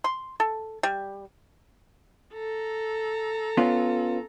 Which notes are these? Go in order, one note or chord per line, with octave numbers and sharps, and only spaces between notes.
C6
A4
G3
A4 A#5
B3 C#4 F4